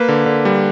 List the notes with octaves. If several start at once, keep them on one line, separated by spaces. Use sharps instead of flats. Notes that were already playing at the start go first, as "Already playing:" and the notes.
Already playing: A#3 B4
D3
D3
G3